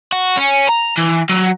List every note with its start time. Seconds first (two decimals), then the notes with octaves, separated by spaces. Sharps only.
0.12 F#4
0.37 C#4
0.69 A#5
0.97 E3
1.29 F#3